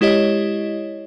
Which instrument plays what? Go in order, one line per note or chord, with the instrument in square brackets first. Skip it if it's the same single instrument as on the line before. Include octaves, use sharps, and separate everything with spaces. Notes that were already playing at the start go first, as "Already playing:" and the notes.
[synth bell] G#3 E4 G4 C#5 D#5